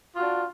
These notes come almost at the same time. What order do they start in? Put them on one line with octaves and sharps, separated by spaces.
F4 F#4 D4